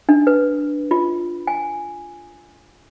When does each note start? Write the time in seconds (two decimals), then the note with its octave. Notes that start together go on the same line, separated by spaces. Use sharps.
0.09 D4
0.27 B4
0.91 F4
1.47 G#5